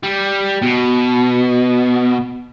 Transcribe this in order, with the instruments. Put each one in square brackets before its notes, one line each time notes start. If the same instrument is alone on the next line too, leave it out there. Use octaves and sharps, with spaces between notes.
[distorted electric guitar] G3
B2